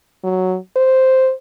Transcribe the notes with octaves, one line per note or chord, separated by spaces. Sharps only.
F#3
C5